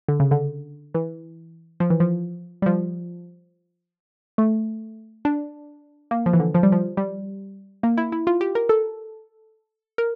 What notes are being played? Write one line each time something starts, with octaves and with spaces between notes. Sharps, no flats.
D3
C#3
D3
E3
F3
E3
F3
G3
F3
A3
D4
A#3
F3
E3
D3
F3
G3
F3
G3
A#3
E4
E4
F4
G4
A#4
A4
A#4